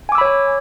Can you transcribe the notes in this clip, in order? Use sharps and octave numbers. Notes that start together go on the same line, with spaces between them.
C#5 G#5 B5 D6 E6